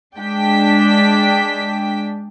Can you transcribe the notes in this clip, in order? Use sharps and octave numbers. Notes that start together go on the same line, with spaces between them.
G#3 D4 G5 B6